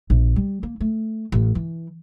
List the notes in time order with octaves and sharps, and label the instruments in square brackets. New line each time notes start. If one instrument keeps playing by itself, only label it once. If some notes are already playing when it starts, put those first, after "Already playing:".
[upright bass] A#1
G3
A#3
A3
A1
E3